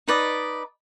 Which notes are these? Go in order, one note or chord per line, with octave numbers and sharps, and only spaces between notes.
D#4 B4 D5 D#5